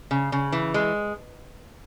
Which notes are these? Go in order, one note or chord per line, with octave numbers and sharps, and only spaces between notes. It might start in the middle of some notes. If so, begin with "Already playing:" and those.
C#3
C#3
E3
G#3